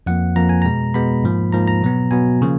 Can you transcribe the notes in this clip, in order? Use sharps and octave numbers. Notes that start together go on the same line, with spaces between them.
F2 F3 A#3 F#5
F2 F3 A#3 A#5
G#5
B2 G#3 B3 A#5
B2 G#3 B3 B5
G#2 F3 A#3
G#2 F3 A#3 A#5
A#5
B2 F#3 B3
B2 F#3 B3 G#5
C#3 F3 A#3